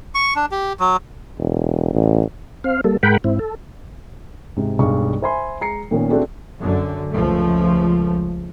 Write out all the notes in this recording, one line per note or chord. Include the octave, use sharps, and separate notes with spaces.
C#6
D4
G4
F#3
E1
A1
C4 F5
G3 A#3 A4
G#2 G#3 A#4 F#5 G5 B5
G#2 C4 E4
A4
G#2 C3
B1 G2 G#3 C#6
C5 E5 G#5 B5 C6
G#3 A#5 C7 C#7
A#2 D#3 B3 C#4
A3 C4 D4 F#4 G#4 A4
F#2 D3
C#2 F3 A3